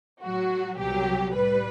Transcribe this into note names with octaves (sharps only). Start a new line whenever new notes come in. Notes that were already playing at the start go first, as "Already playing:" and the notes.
A2 F#3 F#4
C2 B2 F#3 G4
A2 G3 B4